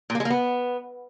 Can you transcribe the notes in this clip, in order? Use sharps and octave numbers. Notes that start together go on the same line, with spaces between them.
A#2
A#3
G#3
A#3
B3